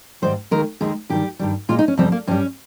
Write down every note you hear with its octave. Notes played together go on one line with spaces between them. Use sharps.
G#2 D#3 G3 C5
D#2 D#3 G#3 A#4
D#2 D#3 G#3 G#4
G2 D#3 G3 G4
G2 D#3 G3
A#2 G#3 F4
D#4
C#4
F2 C3 G3 C4
A#3
G2 G3 C#4